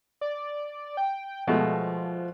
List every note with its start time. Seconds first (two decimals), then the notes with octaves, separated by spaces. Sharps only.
0.21 D5
0.97 G5
1.48 B2 F3 G#3 A3